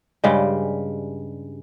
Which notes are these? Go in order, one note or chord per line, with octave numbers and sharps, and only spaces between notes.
G2 C#3 G3 G#3